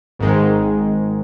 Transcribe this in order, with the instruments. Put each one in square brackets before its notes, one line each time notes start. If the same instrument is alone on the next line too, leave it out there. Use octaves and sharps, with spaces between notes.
[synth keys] G#1 G#2 D#3 G#3